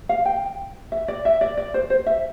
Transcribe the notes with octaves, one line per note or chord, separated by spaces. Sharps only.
F5
G5
E5
D5
E5
D5
D5
C5
C5
E5